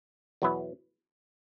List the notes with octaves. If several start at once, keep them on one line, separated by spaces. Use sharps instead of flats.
E2 B2 F#3 B3 E4